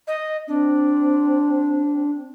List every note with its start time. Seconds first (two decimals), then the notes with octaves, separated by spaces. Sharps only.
0.07 D#5
0.48 C4 D4